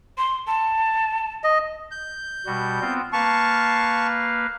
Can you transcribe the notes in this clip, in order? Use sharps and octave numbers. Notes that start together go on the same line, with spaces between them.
C6
A5
D#5
G6
B2 G3 F#4
B3 C4 F4
A#3 B4 F5 A5 C#6